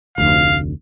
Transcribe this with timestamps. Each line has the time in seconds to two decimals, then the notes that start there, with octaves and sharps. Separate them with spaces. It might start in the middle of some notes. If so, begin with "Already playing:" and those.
0.18 F1 D2 F5